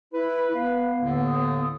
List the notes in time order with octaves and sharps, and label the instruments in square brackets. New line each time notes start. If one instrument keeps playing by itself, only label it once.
[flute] E4 [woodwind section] B4
[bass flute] B3 [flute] F5
[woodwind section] D#2 A2 D3
[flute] D#6